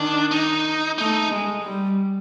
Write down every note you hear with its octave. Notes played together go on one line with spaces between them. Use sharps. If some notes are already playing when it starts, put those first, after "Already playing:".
Already playing: D#3 D4
D#4
A3 D#4
G#3
G3